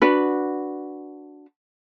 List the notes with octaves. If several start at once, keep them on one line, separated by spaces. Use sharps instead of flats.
D4 F#4 B4